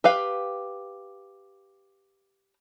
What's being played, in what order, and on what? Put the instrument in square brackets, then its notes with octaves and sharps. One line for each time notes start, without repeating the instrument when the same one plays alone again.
[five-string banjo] G4 B4 F5